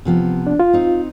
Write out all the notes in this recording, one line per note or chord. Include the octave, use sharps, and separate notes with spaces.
C3 F3 B3
D4
F4
C4 D#4